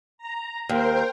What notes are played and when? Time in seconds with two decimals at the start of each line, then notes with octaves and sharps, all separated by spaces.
0.18 A#5
0.69 D#2 A#4 C5 G5